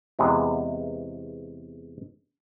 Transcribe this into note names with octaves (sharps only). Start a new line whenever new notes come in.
E2 C3 G#3 B3